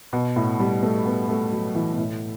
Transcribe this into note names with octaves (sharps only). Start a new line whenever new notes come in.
B2
A2
G3
A3
B3
A3
F#3
E3
B2
A2